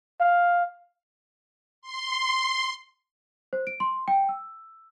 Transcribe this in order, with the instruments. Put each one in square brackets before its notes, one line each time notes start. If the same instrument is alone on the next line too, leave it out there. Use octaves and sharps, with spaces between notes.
[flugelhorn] F5
[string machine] C6
[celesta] C5
D7
C6
G5
E6